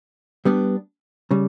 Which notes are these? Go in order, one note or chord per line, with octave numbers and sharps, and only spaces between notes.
G3 B3 D4
C#3 G3